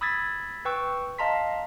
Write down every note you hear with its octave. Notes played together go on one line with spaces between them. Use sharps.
B5 D#6 E6 G#6 A6 B6
B4 G5 C#6 E6
D#5 F5 A5 A#5 C6 B6